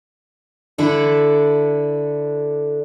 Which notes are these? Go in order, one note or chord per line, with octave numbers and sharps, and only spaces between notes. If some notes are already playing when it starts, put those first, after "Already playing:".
D3 D4 E4 A4